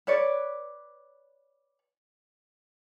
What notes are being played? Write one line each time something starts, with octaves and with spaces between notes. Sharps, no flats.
B4 C#5 D5